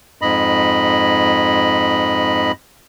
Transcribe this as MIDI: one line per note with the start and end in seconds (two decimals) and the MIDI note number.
0.22 2.52 41
0.22 2.52 44
0.22 2.52 75
0.22 2.52 83